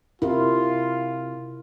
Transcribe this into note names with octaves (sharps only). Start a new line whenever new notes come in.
C3 E4 F4 A#4